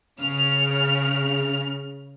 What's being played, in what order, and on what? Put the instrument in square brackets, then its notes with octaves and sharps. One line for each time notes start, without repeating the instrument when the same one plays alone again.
[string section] C#3 F6